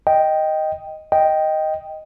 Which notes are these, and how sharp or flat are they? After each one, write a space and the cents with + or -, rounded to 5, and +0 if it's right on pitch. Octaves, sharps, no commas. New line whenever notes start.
D#5 +0 G5 +0
D#5 +0 G5 +0